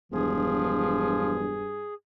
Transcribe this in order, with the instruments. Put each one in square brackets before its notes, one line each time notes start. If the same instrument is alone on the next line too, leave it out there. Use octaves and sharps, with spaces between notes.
[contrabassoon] E1 [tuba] G2 [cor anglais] F3 [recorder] G#4